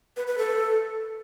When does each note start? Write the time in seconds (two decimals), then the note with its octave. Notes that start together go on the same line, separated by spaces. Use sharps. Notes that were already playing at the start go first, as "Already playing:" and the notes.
0.17 B4
0.27 B4
0.38 A4